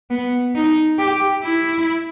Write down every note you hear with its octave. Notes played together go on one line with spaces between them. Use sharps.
B3
D#4
G4
E4